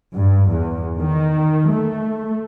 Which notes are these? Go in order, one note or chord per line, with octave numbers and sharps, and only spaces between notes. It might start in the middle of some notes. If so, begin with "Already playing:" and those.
G2
E2
D#3
A3